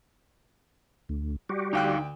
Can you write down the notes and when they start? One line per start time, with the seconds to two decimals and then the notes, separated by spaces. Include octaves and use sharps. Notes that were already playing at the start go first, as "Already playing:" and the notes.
1.09 D2
1.49 G3 F#4 G4
1.73 D2 D#4 F5 G5 F#6